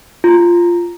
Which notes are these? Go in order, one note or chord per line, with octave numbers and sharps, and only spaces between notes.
F4